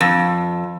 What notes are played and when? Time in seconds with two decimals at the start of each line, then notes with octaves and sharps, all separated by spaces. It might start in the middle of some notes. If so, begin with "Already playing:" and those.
0.01 F2